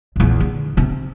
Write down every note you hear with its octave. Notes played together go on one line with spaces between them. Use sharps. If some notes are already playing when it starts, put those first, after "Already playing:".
A#1 E2
D3
C3